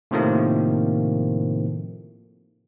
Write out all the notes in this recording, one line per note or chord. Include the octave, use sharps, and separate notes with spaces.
A2 C3 D#3 F3 A3 A#3